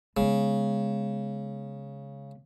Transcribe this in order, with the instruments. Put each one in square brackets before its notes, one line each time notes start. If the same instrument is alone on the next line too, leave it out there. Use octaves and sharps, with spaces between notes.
[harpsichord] C#3 [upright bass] G#3 B3